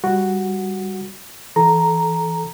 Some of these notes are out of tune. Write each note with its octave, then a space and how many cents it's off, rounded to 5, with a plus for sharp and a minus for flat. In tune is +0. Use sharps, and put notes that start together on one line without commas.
G3 +0 F#4 +0
E3 +0 A4 -25 A#5 +0